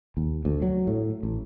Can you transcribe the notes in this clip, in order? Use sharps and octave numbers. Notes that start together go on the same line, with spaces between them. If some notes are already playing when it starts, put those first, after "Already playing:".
D#2
D2
F#3
A2
A1